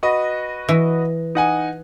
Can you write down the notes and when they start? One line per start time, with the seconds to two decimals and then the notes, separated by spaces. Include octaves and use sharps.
0.03 F#4 B4 D#5
0.69 E3
1.35 D#4 F#5 G#5